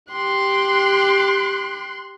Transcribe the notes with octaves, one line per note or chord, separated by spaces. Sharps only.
G4 C6 F#6